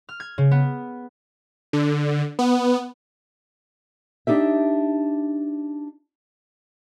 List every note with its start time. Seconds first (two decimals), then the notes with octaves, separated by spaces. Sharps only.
0.09 F6
0.20 G#6
0.38 C#3
0.51 B3
1.73 D3
2.39 B3
4.27 D4 D#4 G4 E5